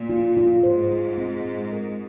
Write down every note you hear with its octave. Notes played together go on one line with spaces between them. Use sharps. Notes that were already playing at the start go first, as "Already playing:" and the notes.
Already playing: A#2
F4
F4
G#2 C5
F4
C4
C4
A#4